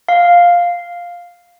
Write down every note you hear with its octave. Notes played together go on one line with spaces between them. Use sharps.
F5